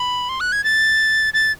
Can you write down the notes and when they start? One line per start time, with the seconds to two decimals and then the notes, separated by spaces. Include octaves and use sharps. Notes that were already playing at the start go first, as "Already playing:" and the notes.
Already playing: B5
0.29 C6
0.40 F#6
0.52 G#6
0.64 A6
1.34 A6